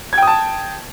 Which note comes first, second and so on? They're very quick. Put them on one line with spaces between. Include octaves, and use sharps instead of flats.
G#6 G5 D#6 A5